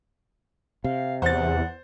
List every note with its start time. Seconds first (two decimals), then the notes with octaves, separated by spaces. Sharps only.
0.84 C3 F5
1.22 E2 C5 F#5 A6